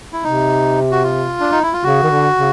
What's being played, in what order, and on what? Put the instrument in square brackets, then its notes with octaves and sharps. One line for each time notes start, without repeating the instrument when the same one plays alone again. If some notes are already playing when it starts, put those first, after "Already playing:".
[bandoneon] E4
[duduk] C3 [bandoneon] D#4
[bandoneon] F#4
F4
D4
D#4
E4
F4
[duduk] C#3 [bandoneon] F#4
[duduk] D#3
D3
C#3